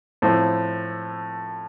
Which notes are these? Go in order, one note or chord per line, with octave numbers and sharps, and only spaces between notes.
A2 F3 C4 E4